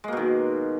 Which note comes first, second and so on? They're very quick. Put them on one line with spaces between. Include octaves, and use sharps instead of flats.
G#3 A#3 B2 D#3